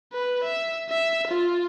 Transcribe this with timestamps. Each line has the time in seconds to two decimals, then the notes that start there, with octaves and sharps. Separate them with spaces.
0.13 B4
0.44 E5
0.90 E5
1.27 F4